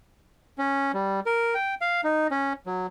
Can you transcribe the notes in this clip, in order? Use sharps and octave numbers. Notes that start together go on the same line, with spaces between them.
C#4
G3
A#4
G5
F5
D#4
C#4
F#3